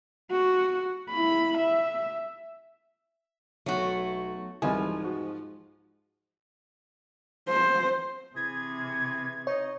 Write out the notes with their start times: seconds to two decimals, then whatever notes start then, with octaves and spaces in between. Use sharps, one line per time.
0.31 F#4
1.11 E4 B5
1.58 E5
3.66 B1 F#3 A3 F#4
4.62 C2 G#2 E3 F3 G#3 G#5
5.04 F#4
7.49 C5
8.36 C3 E3 G#4 G#6
9.47 D#4 C#5 D#5